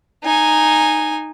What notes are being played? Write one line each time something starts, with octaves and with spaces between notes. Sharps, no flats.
D#4 G#5